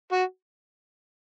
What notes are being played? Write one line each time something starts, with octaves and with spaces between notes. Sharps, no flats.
F#4